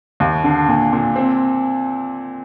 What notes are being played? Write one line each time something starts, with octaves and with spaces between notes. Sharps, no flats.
D#2
D3
A#2
A#2
C4